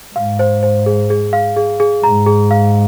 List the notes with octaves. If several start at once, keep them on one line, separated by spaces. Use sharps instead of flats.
G#2 F5
C5
C5
G#4
G#4
F5
G#4
G#4
G#2 A#5
G#4
F5